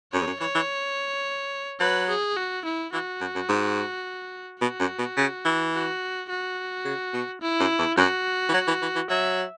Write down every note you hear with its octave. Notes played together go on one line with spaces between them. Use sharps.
F#2 C#5
E2
F#2
E3 C#5
E3
F#3 B4
G#4
F#4
E4
E3 F#4
F#2
F#2
G#2
B2 F#4
F#2
B2
C#3
E3
F#4
F#4
C#3
B2
E4
F#2
E2
F#2 F#4
E3
F#3
E3
E3
E3
F#3 E5